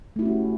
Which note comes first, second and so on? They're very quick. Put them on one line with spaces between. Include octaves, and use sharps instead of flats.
A3 E4 F#4 C#4 G4